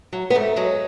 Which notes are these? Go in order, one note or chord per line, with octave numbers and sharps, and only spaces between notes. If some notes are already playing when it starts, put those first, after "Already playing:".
F#3
B3
G#2 A3
F#3 G#3